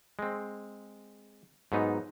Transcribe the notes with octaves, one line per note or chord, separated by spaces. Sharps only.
G#3 C4
G#2 F#3 B3 D#4